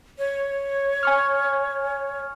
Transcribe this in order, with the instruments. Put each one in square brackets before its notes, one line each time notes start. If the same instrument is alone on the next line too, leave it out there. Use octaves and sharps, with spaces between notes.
[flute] C#5
[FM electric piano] G#5 C#6 F6